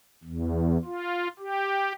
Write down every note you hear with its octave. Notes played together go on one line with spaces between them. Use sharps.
E2
F4
G4